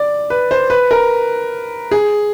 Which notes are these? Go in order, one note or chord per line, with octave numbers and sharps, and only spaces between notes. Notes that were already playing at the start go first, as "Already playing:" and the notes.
Already playing: D5
B4
C5
B4
A#4
G#4